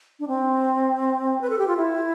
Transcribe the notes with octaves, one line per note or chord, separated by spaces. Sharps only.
D4
C4
B4
A4
G4
F4
E4